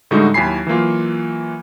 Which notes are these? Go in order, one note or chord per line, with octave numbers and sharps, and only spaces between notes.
A2 D3 G3 G#3 D#4 F#4
D#2 F#3 E4 G#5 B5 C7
E3 F#3 A#3 F4